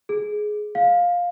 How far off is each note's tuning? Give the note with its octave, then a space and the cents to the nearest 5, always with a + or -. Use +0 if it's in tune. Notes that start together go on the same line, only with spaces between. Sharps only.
G#4 +15
F5 +10